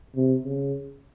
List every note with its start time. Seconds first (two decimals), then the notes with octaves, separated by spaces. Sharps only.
0.15 C3
0.43 C#3